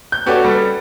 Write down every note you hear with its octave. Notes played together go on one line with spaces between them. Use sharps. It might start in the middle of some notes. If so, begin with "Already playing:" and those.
G6
C#4 F#4 G4 A4 B4 D5
G3 B3 A4